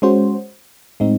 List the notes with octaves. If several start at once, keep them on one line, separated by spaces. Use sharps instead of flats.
G#3 C#4 F#4 C5
A2 G#3 C4 D#4